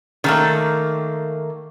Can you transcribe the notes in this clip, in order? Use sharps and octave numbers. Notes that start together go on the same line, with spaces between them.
D#3 A3 A#3